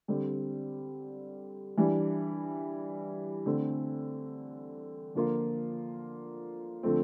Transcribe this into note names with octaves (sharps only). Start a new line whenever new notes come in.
D3 G3 C4 G4
E3 G3 D4
D3 A3 C4
D3 F3 A#3 F4
D3 F3 A3 C4